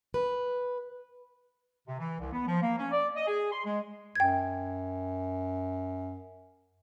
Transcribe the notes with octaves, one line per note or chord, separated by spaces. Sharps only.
B4
C3
E3
C2
B3
F3
A#3
C#4
D5
D#5
G#4
C6
G#3
F#2 G5 G#6